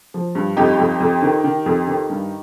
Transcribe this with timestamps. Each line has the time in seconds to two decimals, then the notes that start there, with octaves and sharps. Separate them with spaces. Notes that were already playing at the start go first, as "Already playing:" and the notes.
0.14 F3
0.35 G2
0.57 F2 D#4 G4
0.79 F2
1.00 F2
1.22 D#3
1.44 D#3
1.66 F2
1.87 D#3
2.10 G2